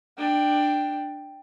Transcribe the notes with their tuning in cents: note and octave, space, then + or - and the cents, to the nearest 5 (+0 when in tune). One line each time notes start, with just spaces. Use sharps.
D4 +15 G5 +0